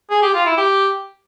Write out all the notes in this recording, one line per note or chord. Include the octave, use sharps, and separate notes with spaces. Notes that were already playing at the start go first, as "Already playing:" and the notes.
G#4
G4
F4
E4
G4